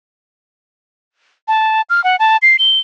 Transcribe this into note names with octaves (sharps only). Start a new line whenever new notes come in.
A5
F6
F#5
A5
C7
G7